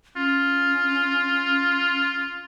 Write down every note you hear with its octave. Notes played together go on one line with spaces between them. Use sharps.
C#4 F4